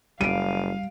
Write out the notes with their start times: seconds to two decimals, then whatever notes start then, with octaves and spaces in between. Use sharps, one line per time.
0.21 F#1 G3 F5 D7 D#7